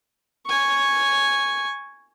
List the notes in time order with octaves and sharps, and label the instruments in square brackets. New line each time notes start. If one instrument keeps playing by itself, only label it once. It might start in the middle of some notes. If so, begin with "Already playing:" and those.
[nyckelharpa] G#5 C#6